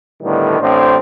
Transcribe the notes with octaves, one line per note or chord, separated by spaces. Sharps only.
A2 D3 D#3 G3 B3
A1 A2 C4 D4 C5